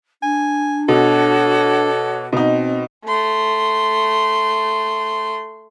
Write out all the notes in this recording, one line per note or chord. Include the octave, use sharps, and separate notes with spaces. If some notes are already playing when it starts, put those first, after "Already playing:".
D4 G#5
B2 F#4 A4 C#5 D6
B2 C4 D#4
A3 C6